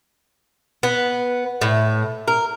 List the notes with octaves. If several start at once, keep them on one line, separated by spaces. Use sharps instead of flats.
B3
A2
A#4